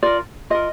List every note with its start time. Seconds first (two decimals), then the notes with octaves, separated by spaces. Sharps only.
0.02 F4 A#4 D5
0.50 F4 A#4 D#5